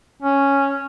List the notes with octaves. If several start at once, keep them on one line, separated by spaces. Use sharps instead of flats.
C#4